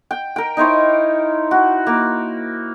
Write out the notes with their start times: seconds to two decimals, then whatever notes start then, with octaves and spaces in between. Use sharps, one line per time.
0.11 G5
0.36 A#4 G5
0.57 D#4 E4 C5 C#5
1.51 F#4
1.87 A#3